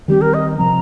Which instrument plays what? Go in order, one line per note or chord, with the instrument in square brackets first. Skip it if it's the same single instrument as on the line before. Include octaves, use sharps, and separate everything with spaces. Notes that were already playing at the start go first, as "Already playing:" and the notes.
[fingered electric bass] D#3 G3 C4 [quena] G4
[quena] A#4
D#5
[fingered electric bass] C3 F3 C4 [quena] A#5